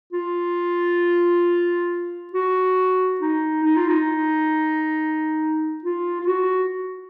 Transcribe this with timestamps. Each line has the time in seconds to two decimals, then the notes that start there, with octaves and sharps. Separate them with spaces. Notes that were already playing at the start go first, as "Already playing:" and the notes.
0.13 F4
2.33 F#4
3.21 D#4
3.64 D#4
3.76 F4
3.88 D#4
5.84 F4
6.21 F4
6.27 F#4